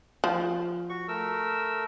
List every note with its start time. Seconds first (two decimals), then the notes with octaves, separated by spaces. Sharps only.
0.24 F3
0.89 F#4 C#6
1.08 A3 A#4 E6